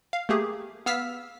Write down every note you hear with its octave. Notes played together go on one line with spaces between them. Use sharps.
F5
A3 A#3 G4 G#4
B3 F5 E6 F6 B6